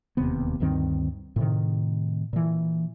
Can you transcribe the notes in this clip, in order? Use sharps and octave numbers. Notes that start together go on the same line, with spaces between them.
E1 D#2 C3 B3
D2 G2 D#3 C4
A2 C3 D#3
A#2 E3